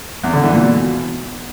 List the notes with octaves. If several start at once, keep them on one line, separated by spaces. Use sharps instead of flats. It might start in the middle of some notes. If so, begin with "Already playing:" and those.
E2
D3
E3
A#2
B2